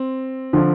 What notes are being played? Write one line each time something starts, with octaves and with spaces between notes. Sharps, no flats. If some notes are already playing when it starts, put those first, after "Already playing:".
Already playing: C4
D3 F3